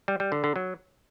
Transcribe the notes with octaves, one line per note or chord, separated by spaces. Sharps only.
G3
G3
D3
D3
F#3